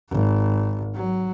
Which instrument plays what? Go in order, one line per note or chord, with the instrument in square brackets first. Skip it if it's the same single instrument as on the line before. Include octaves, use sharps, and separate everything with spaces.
[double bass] G#1
F#3